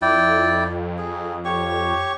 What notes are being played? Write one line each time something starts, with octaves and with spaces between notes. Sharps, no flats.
F2 E4 D5 G5
G#4
G4 C#5 C#6